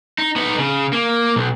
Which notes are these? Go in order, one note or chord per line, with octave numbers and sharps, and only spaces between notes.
D#4
B3 D#4
C#3
A#3
B1